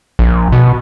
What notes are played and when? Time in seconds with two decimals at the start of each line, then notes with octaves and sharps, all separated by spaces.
0.19 A#1
0.52 B2